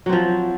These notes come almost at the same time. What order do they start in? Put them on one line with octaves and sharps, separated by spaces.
F#3 C4 F3